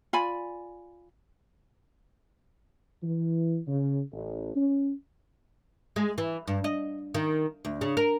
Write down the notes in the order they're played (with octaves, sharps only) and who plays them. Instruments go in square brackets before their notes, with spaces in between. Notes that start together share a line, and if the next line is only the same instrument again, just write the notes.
[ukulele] F4 D5 G#5 B5
[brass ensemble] E3
C#3
A1
C#4
[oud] G#3
E3
G2
D#5
D#3
D2
C#3
A#4